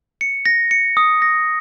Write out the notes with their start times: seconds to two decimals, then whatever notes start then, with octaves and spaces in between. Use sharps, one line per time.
0.21 C#7
0.46 A#6
0.71 C#7
0.97 D#6
1.22 A#6